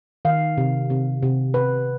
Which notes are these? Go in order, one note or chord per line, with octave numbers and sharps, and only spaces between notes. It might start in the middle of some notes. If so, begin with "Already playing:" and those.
D#3 F5
C3
C3
C3
C3 B4